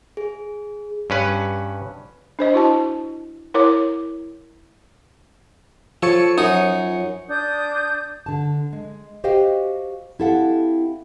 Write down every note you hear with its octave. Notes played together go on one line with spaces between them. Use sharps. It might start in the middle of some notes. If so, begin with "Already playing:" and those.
G#4
G2 C#4 B4
D4 C5 D#5
E4 F#4 A5
E4 A#4 C#5 D6
F3 A4 C#5 C#7
F#2 D#4 D#6
D4 D#6 G6
D3 A5
G#3
F#4 G4 C5 D#5 F5 G5
C4 E4 G4 A4 F5 F#5